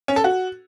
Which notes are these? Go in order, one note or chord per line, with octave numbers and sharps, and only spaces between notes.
C#4
A4
F#4